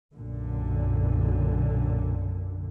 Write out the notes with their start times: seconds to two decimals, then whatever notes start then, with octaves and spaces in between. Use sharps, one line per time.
0.16 B1 F#2 A#2 D3